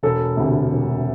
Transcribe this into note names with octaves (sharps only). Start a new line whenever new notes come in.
E1 A4
D2 C3
E1